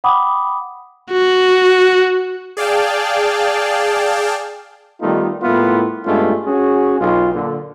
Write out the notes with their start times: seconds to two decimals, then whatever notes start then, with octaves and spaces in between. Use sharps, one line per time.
0.04 F#5 G5 B5 D6 D#6
1.11 F#4
2.57 G#4 D5 F5 G5 A5
5.02 D#3 G3 A3 B3 D#4 F4
5.43 A2 G3 A#3 B3 E4 F4
6.06 G2 G#3 A3 B3 C#4 F4
6.46 C#4 F#4 G#4
6.99 B1 F4
7.33 A#2 D3